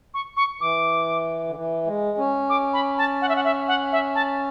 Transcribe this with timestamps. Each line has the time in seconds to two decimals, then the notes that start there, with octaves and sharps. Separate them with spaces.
0.14 C#6
0.37 C#6
0.61 E3 D6
1.48 D3
1.55 E3
1.87 G#3
2.18 C#4
2.49 D6
2.73 B5
2.98 A5
3.22 F#5
3.29 E5
3.36 F#5
3.44 E5
3.68 F#5
3.92 E5
4.15 A5